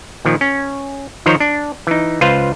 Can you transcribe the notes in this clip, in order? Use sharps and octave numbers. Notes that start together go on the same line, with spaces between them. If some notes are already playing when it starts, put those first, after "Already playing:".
A#2 D#3 F3
C#4
D#3 F3 D#4 C5 C#5 A#5
D4
E3 D#4
C#2 F4 B4 C5 F5